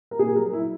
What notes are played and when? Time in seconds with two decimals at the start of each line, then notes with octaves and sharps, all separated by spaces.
0.11 A#4
0.19 A#2 G#4
0.35 F#3 A#4
0.53 E4